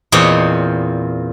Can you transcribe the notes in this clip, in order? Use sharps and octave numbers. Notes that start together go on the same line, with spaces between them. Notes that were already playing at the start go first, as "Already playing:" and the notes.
E2 A#2 C4 C#5 D#5